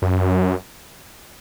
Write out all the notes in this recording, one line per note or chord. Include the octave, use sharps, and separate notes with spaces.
F#2